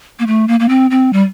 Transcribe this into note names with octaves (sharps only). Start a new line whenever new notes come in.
A#3
A3
A#3
A#3
C4
C4
G3